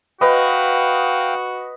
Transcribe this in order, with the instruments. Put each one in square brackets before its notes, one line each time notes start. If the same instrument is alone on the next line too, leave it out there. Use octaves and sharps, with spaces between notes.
[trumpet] F#4 [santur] B4 D#5 [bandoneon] F5 G5